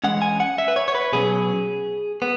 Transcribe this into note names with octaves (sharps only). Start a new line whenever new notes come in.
E3 G#3 C#4 F#5
G#5
F#5
E5
B4
C#5
C#5
B4
B2 F#3 C#4 G#4
B3